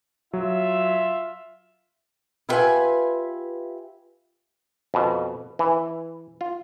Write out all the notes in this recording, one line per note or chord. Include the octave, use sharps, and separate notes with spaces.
F#3 F4 E5
E4 F4 G4 B4 E5 G#5
F2 B2
E3
F4